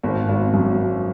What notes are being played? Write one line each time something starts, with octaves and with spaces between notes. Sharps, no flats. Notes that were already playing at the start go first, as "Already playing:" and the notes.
G#1
G#1
F#2